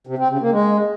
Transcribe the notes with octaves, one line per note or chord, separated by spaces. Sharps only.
C3
C4
C#3
A#3
G#3